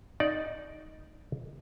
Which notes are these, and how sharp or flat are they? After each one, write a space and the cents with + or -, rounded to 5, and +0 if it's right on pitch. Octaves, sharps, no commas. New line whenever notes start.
D#4 +0 D5 +0